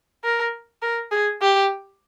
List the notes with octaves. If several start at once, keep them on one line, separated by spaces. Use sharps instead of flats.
A#4
A#4
G#4
G4